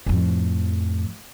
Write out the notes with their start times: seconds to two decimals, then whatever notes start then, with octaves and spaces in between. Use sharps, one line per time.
0.06 F2 A2